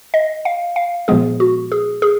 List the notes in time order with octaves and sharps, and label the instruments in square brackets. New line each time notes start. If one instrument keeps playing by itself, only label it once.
[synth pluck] D#5
F5
F5
A#2 F3 G#3 B3 G#4
F#4
G#4
G#4